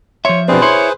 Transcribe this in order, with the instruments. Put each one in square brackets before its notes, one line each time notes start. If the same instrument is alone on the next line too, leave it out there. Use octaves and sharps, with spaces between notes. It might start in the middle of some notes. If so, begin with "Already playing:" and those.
[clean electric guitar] F3 E5 [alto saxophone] C#5 [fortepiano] C6
[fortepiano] B2 D4 [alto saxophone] C4 [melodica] G#4 B4 C5
[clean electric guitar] E4 [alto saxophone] C#5 [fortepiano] C6